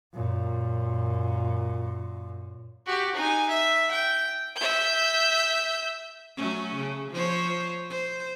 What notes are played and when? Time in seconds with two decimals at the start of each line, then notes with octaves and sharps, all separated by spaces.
0.14 F#2 A#2
2.86 F#4 G4
3.15 D#4 G#5
3.49 E5
3.91 G5
4.56 E5 G6
6.37 F#3 A3 C#4
6.76 C#3
7.12 F3 C5 C#5
7.90 C5